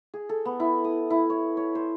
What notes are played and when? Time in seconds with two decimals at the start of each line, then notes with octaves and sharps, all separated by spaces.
0.14 G#4
0.29 A4
0.45 B3
0.60 E4
0.84 D#6
1.10 E4
1.30 C#5
1.57 C#5
1.75 C5